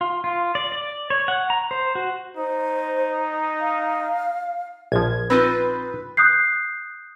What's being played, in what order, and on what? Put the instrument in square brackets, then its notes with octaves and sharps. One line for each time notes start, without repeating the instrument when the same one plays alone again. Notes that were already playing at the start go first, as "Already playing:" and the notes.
[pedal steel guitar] F4
F4
D5
D5
C#5
F#5
A#5
C5
F#4
[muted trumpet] D#4 [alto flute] C5
[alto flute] F5
[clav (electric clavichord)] A#1 F3 [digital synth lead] G#6
[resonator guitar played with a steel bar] C4 D#4 F4 [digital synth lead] B4
[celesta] D#6 F#6 G6 C7